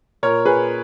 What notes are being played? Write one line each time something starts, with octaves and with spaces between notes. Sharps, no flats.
A#2 A#4 C#5
A#2 G#4 B4